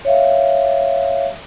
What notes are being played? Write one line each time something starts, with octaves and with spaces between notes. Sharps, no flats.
C#5 E5 F5